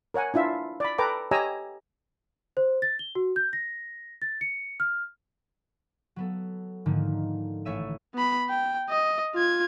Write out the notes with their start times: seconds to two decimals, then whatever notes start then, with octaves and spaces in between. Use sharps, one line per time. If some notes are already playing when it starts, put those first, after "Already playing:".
0.14 A#4 C#5 F#5 G#5
0.34 D4 E4 F4 E5
0.80 D5 B5
0.98 A4 B4 G5 A#5 D6
1.31 G4 C#5 D#5 G#5 A#5 E6
2.57 C5
2.82 A6
2.99 G7
3.15 F#4
3.36 G6
3.53 A#6
4.22 A6
4.41 C#7
4.80 F6
6.16 F#3 B3 A4
6.86 G#2 D3 D#3 F3 A#3
7.65 A1 A3 C#5 E5 E6 D#7
8.14 B3 B5
8.49 G5
8.90 D#5
9.35 F4 G#6